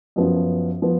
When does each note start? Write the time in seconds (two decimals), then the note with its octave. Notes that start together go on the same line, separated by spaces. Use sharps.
0.16 F#2 F3 B3
0.82 F3 B3